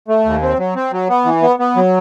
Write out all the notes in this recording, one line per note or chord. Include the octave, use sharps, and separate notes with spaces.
A3
D#2
C4
F#3
C4
F#3
B3
E3
B3
B3
F#3